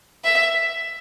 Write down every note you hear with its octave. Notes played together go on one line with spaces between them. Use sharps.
E5